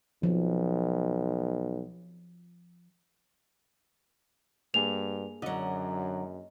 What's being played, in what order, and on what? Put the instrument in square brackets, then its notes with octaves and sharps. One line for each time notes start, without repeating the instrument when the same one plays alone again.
[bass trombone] B1 [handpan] F3
[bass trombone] G2 [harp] A#3 G#4 [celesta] F7
[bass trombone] F#2 [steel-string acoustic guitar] D3 F#3 [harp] D#5